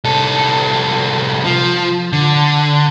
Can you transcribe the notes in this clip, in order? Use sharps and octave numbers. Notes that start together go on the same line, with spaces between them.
C2 A4
F3
D3